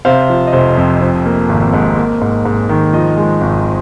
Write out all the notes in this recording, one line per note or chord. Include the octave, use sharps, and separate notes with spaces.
C3 C5 F5
F3
D#5
F1 C5
F2 D#5
F3 C5
A#3
G#1
G#2
A#3
G#2
G#2
D#3
F3 D#5
G#3
G#1